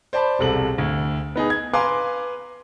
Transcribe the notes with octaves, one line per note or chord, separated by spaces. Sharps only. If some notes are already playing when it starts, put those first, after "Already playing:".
C5 D5 A5 B5
E1 C2 A4 F#7
D2
B3 D#4 G#4
G#6
B4 F5 G#5 A#5 C6 D6